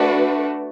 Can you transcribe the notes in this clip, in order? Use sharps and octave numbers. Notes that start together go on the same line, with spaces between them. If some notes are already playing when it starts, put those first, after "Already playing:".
Already playing: A3 D4 F#4 B4